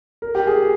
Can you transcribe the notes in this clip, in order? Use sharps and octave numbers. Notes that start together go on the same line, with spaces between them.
A#4
G4
G#4